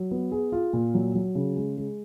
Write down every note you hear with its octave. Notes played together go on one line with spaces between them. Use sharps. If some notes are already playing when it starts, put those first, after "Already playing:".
Already playing: F#3
B3
G#4
F4
A#2
F#3
F#3
C#3
G#3
G#3